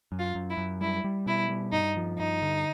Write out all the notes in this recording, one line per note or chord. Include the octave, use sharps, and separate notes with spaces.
F#2
F4
F#2
E4
F#2
G3 E4
G3
B2 E4
G3
G2 D#4
F3
G2 D#4
D3